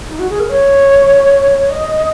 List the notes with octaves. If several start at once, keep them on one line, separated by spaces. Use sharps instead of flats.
D#4
F#4
G#4
A#4
C#5
D#5